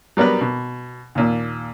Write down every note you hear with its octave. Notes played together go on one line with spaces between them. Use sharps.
F#3 G3 B3 A#4 B4
B2
D#2 A#2